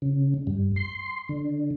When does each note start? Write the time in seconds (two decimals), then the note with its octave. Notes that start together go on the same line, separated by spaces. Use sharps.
0.02 C#3
0.47 G2
0.76 C6
1.29 D3